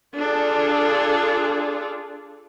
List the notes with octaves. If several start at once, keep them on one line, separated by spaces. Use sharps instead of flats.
D4 F4 G#4 A4